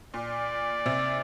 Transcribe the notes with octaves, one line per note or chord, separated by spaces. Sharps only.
A#2 D5
C3